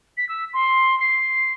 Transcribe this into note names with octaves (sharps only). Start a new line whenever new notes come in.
B6
E6
C6
C7